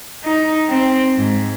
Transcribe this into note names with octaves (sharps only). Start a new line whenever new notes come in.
D#4
C4
G#2